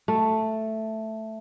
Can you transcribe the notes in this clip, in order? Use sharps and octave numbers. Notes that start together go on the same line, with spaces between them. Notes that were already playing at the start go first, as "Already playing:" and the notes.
A3